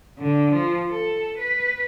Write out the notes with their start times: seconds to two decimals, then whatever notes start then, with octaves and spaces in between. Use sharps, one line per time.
0.19 D3
0.54 F3
0.90 A4
1.38 B4